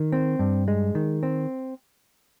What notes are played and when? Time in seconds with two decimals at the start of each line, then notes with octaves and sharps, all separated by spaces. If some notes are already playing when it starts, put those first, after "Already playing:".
Already playing: D#3
0.12 C4
0.39 G2
0.68 G#3
0.95 D#3
1.23 C4